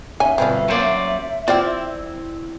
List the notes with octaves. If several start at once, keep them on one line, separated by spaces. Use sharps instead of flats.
C#4 D#4 E5 G#5
G2 B2 D3 F3 C4
F#3 A#3 C#4 C5 D5
C4 E4 F4 C5 D5 G5